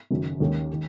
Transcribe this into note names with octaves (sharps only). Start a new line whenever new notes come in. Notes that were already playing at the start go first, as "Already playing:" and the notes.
F#1 F#2 D#3 F#3
D#2 D#3 A#3 C#4
D#3